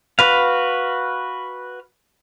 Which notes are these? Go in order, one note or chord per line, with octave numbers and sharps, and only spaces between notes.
F#4 B4 F5